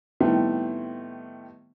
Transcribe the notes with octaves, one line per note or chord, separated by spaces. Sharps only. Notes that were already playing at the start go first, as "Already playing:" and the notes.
A2 D#3 G3 A3 B3 C4